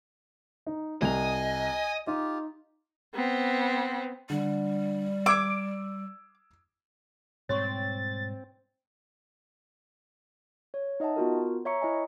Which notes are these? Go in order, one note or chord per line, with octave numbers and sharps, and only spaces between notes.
D#4
C2 D#5 G#5 F7
D#4 F4 G4
B3 C4
D3 G3
D6 E6 G#6 D7
G#2 B2 G3 C4 C#5 C6 C#6 A6
C#5
D#4 D#5 E5 F#5 A5
B3 F4 F#4 A#4
C#5 E5 A#5 C#6 C#7
E4 D#5 G#5